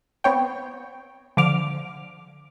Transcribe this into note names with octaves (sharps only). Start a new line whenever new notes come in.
B3 C4 C#5 G5
D3 F3 D6 F6